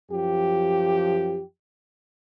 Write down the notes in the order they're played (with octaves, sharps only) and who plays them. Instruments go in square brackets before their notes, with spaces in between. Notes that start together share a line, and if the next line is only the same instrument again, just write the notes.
[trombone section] F#2 F3 G4